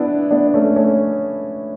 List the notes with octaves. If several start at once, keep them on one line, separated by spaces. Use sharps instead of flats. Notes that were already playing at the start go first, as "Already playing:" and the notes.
Already playing: B3 D4 E4
B3 D4
A3 C#4
A3 C#4